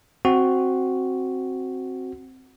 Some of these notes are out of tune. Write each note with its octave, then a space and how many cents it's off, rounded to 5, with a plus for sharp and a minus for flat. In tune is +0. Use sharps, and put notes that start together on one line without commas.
C4 +5 F#4 +0